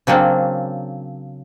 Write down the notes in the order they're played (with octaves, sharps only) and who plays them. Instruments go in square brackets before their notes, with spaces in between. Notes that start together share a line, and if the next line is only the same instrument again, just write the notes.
[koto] C#3 F#3 A#3 C4 D4